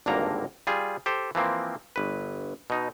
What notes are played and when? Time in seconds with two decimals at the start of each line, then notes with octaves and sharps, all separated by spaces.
0.06 G#1 C#2 G2 D3 A#3 A#5
0.67 G3 F4 G#4
1.06 G4 A4 C5
1.35 E3 F3 A#3 C4
1.96 G1 B4
2.70 B2 D#4